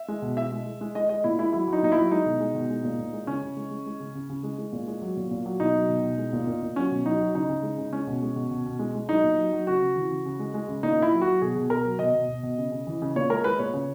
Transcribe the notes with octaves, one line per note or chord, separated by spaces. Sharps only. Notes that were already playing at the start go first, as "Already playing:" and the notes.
Already playing: E5
G#3
B2
G#3 E5
G#3
G#3
G#3
G#3 D#5
G#3 D#5
A#2 E4
G#3 E4
F#3 E4
F#3
D#4
A#2 D#4
E4
F#3
G#3 D#4
B2
G#3
B2
G#3
A#2
A#2
G#3
C#3 C#4
C#3
G#3
G#3
G#3
C#3
C#3
C#3
G#3
G#3
A#2
G#3
F#3
A#2
A#2
F#3
B2 D#4
F#3
B2
B2
G#3
A#2
A#2
A#2
F#3 C#4
B2
F#3 D#4
F#3
C#3 D#4
C#3
G#3
C#3
G#3 C#4
B2
G#3
B2
B2
B2
G#3
G#3
F#3 D#4
A#2
F#3
F#3
C#3 F#4
C#3
E3
C#3
C#3
G#3
G#3
C#3
A#2 D#4
A#2 E4
F#3
F#4
F#3
B2 G#4
B2
B2 A#4
F#3
B2 D#5
B2
B2
B2
C#3
C#3
E3
C#3
A#2 C#5
G#3 A#4
G#3 B4
A#2 C#5
C#3